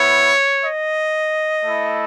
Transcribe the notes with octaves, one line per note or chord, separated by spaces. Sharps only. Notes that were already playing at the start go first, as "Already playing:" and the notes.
Already playing: B3 E4 C#5
D#5
A3 E4